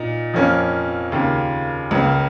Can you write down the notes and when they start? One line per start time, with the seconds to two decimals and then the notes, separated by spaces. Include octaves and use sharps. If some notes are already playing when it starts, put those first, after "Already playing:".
Already playing: A#2 A#3 D#4
0.34 F2 F3 A#3 C#4 A#4
1.12 D#2 C#3 A#3 F4
1.91 C#2 C#3 A#3